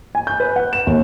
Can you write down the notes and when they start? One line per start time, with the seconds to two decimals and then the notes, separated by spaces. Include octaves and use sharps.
0.15 G#5
0.27 G6
0.40 B4
0.56 F#5
0.73 E7
0.87 D#2